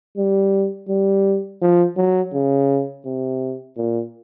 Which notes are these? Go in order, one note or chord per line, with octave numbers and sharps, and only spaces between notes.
G3
G3
F3
F#3
C#3
C3
A#2